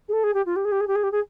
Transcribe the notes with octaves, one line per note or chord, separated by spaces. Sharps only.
G#4
A4
G#4
G4
F4
G4
G#4
G4
G#4
G4
G#4
G4
G#4